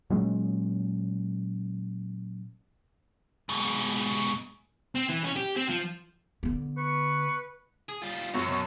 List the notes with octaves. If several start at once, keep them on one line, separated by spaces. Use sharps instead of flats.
A#2 F#3 G#3 C#4
G#2 B2
C4
E3
C#4
G4
C4
F3
D3 B3
B4 C#6
G#4
G3 F4
F#2 F#3 C4 F#4 C#5
B2